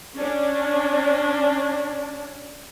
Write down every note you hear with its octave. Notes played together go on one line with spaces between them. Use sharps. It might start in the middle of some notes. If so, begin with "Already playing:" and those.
C#4 D4